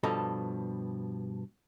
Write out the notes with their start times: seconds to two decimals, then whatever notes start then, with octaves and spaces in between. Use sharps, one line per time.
0.03 G2 B2 F3 A4 A#5